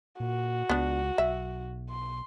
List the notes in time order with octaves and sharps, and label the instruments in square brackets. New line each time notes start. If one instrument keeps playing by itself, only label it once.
[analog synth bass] A#2 [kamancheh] F#4
[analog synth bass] C#2 [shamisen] B3 D4
[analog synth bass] B1 [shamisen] E5
[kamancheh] C6